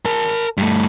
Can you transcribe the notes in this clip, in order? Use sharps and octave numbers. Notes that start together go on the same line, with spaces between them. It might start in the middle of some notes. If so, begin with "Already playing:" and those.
A#4 A5
G2 A3